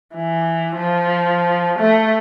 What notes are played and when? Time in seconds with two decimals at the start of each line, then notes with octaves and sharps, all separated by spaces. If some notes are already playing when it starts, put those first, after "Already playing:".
0.15 E3
0.76 F3
1.79 A3